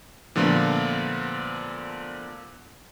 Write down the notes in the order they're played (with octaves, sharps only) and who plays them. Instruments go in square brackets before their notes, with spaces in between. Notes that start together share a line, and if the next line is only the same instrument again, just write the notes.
[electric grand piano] A#2 D3 F3 A3 B3 F4